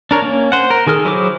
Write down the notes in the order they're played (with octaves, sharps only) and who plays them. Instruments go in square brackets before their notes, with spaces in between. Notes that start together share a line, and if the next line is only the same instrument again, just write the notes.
[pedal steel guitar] D4 A#4 C#5
A#3 C#4
C5 F#5
A#4
D#3 G#4 A4 F6
F#3 E4 G#4 C5 D6